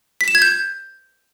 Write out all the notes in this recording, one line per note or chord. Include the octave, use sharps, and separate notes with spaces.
B6
E7
G#6
G6